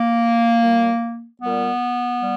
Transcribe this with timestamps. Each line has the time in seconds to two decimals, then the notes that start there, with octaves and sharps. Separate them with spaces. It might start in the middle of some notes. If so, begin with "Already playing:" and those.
Already playing: A#3
0.63 A#2 G3
1.42 A#2 G3 B3
2.21 G3